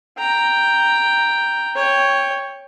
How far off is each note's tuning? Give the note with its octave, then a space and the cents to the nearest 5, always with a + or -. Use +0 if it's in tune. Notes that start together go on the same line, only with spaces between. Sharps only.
G5 +0 A#5 +0
C#5 +0 G5 +15